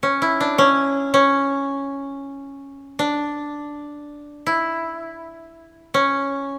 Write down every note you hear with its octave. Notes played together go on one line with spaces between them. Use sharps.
C#4
E4
D4
C#4
C#4
D4
E4
C#4